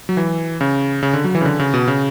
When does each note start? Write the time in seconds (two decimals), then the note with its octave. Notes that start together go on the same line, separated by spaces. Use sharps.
0.09 F#3
0.17 E3
0.61 C#3
1.03 C#3
1.13 D3
1.24 F#3
1.35 E3
1.41 C#3
1.45 D3
1.59 C#3
1.74 B2
1.88 C#3